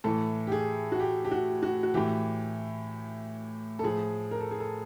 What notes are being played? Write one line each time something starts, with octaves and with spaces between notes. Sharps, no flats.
A2 E3 A4
G4
G#4
F#4
G4
G4
F#4
F#4
F#4
A2 E3 G4
A4
A2 F3 G#4
A#4
A4
G#4
A4